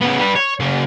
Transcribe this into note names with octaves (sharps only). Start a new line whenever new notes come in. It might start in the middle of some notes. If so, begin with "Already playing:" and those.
C#3 B3
G3 B4
C#5
C#3 A#3